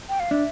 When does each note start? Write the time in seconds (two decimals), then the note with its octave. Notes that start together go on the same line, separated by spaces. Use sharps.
0.09 G5
0.20 F5
0.31 D4 E5